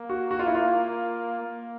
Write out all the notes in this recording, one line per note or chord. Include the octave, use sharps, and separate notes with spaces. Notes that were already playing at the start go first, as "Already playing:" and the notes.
Already playing: A#3
F#4
F#4
F4
E4
F4
A#3